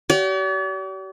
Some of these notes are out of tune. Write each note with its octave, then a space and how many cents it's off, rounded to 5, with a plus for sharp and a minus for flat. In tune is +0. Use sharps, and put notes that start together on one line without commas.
G4 -45 D5 -45